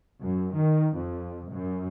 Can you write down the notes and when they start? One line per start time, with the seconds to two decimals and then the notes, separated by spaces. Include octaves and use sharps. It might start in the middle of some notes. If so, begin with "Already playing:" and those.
0.23 F#2
0.54 D#3
0.95 F2
1.51 F#2